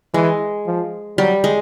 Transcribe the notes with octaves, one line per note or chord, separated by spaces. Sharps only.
E3 G#3
F3
F#3 G3
G#3